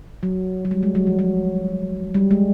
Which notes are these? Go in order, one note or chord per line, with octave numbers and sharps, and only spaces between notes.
F#3
F#3
G3
G#3
F#3
F3
F#3
G3
G#3